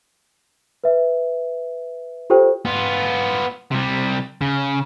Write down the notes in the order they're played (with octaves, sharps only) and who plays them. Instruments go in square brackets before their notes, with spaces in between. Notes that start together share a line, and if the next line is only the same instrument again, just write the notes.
[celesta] B4 E5
F4 G4 A4 C5 G5
[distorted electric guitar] B3 F4
C3 G3
C#3